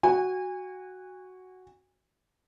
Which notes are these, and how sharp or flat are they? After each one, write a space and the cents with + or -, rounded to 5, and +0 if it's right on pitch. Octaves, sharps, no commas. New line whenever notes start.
F#4 +0 G#5 -30